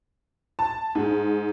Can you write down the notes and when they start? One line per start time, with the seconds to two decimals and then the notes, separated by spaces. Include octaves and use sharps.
0.59 A5
0.95 G#2